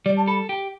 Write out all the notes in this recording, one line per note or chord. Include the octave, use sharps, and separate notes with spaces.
G3 D5
A5
A4 B5
G4